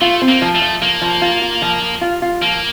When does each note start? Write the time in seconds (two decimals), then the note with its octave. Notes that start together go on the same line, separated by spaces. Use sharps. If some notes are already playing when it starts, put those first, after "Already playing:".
0.01 A3 F4
0.22 C4
0.28 A#3
0.42 F3
0.55 A3
0.62 F3
0.82 F3 A#3
1.02 F3
1.22 F4
1.42 F4
1.62 F3
1.82 F3
2.01 F4
2.22 F4
2.42 F3 A#3